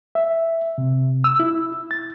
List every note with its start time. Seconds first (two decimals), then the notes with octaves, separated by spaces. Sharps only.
0.15 E5
0.78 C3
1.24 E6
1.40 E4
1.91 A6